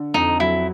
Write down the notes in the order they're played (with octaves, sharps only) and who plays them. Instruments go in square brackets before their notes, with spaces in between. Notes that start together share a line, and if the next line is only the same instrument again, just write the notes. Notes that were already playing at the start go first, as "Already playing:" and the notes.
Already playing: [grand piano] D3
[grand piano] F2 [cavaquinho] D#4
[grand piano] F#3 [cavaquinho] E4